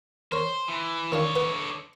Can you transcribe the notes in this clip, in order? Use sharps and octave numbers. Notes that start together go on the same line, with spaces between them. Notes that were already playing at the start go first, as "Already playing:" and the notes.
A#4 C5 C#5
E3
D3 D#3 D4 F4 C#5
B4 F#5